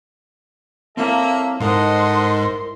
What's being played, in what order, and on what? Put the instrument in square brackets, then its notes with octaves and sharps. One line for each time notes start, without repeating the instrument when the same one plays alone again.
[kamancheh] A#3 [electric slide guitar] C4 E4 C#5 [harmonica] A4 E5
[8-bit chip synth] G#2 [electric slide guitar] E4 A#4 C5 [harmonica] A4 D#5 F#5 [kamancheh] C6